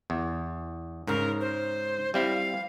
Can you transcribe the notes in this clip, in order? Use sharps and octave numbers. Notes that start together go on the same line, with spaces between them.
E2
G#2 C#3 A#4
C5
G3 C4 E4 F5